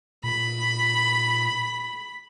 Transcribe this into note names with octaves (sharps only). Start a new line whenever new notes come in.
A#2 B5